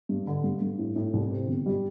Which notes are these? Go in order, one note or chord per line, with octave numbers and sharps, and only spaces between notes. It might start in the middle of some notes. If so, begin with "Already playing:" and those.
G2
D3
G2
G2
A2
A2
C2
C3
G1
G3